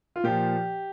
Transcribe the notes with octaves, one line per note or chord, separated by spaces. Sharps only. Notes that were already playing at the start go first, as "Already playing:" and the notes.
F4
A#2 F3 G4